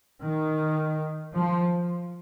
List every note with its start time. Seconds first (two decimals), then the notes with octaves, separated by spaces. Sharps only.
0.21 D#3
1.34 F3